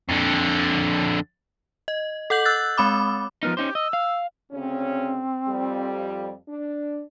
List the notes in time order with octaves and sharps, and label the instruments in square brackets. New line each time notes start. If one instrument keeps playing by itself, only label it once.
[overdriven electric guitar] F2 D3
[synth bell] D#5
A4 F#5 G6 F#7
E6 F#6 A6
G#3 C4 B5 D6
[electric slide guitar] F3 B3 D#4 [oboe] A#4
[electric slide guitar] C#4 D#4 C5 [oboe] G4
[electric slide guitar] D#5 [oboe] E6
[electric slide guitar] F5
[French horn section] D2 C#3 C#4 [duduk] C4
[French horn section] F2 G3
D4